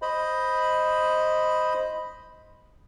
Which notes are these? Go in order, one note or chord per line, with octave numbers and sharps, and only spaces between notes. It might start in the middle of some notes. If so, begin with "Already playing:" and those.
C5 D#5 B5